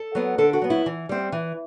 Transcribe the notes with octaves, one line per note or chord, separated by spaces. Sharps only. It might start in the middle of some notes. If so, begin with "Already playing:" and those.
Already playing: A4
F#3 B3
D3 A4
F#4
F#3 B3
E4
E3
G3 C4
E3